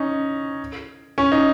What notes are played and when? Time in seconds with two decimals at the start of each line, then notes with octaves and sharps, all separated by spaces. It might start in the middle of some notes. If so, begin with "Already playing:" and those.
Already playing: C#4 D#4
1.18 C#4
1.32 D#4